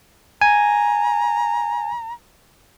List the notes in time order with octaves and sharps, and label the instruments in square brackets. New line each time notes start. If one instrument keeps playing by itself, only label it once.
[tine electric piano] G#5 [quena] A#5